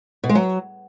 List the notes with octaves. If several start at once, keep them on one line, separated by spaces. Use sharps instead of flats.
B2
G#3
F#3